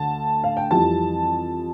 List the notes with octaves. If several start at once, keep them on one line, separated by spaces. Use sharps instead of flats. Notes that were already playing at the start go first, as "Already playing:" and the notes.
Already playing: D2 D3 A5
F5
G5
F2 E3 G3 A5